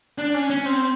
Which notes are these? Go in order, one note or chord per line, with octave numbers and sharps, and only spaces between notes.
D4
C#4
C#4
C4